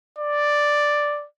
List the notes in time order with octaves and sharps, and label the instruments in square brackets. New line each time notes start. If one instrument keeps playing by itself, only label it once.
[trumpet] D5